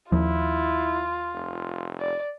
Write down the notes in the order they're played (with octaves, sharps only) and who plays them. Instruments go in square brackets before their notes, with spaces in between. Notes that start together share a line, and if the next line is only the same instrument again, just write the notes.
[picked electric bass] D#2 F3 [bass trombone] E4 [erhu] F4
[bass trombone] F1
[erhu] D5